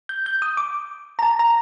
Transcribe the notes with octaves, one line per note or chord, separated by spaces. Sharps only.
G6
G6
D#6
D6
A#5
A5
A#5